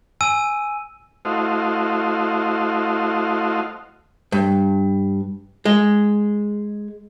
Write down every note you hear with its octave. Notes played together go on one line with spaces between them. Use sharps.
G#5 E6 D#7
A3 E4 F#4 C5 D#5 F5
G2
G#3